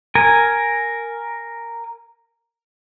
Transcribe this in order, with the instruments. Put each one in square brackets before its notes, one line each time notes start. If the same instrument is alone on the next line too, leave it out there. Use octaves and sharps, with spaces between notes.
[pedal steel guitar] A#4 G#5